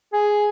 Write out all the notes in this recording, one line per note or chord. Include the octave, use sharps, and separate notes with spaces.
G#4